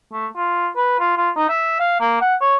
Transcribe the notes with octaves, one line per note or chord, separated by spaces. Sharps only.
A3
F4
B4
F4
F4
D#4
E5
F5
A#3
F#5
C#5